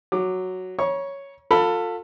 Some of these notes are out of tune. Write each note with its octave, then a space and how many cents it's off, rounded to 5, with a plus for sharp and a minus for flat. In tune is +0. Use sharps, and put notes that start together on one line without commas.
F#3 +0 D6 +10
C#5 +0 A#5 +40 C#6 +0
F4 +30 A4 +25 B5 +0